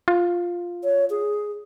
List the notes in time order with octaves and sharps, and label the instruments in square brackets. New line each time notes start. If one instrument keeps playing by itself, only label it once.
[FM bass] F4
[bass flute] C#5
G#4